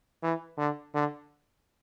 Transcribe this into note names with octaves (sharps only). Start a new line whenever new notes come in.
E3
D3
D3